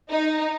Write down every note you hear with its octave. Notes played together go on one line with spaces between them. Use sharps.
D#4